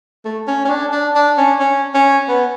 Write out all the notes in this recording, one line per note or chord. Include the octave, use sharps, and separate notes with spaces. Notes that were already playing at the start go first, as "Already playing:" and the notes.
A3
C#4
C#4
D4
D4
D4
C#4
C#4
C#4
B3